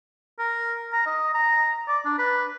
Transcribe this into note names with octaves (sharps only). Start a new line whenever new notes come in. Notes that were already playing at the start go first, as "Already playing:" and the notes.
A#4
A#5
D#5
A#5
D5
D4
B4